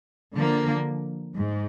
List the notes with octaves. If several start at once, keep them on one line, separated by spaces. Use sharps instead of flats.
D3 F3 A#3
G#2